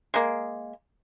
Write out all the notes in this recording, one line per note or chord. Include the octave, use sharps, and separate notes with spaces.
G#3 A#3